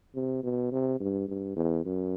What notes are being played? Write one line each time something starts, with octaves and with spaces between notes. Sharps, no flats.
C3
B2
C3
G2
G2
E2
F#2